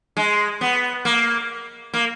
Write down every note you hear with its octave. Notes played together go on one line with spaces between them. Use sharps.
G#3
B3
A#3
A#3